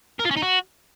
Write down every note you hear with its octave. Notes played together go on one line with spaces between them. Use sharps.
A#4
F4
C#4
D#4
F#4